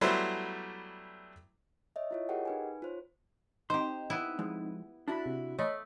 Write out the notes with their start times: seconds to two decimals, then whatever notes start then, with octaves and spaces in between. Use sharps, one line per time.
0.01 F#3 G3 A3 B3 E4 C5
1.96 C#5 D#5 E5
2.11 E4 F4 C#5
2.29 G4 G#4 A#4 D#5 F#5 G5
2.45 D#4 B4 G#5
2.82 F4 C5 C#5
3.70 C4 D#4 G4 C5 C6
4.10 B3 E4
4.39 F3 G#3
5.08 D4 E4 F#4 A5 B5
5.26 C3
5.59 A3 C#5 D#5 B5